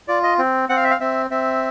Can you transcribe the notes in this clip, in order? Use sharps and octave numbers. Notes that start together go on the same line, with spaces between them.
F4 D5
D#5
C4
C4 F#5
F5
E5
F5
C4 E5
C4 E5